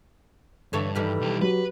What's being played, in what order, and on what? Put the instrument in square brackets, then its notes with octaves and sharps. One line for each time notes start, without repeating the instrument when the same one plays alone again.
[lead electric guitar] G2 [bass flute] D3 [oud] E3 A4 C#5
[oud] D#3 E3 G3 [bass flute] A4
[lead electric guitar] B1 G4
[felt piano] F#3 [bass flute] G4 [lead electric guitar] B4